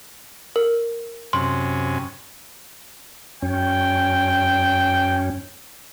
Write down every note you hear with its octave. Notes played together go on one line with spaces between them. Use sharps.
A#4
F#2 C3 C#4 C6
F#2 C#4 G5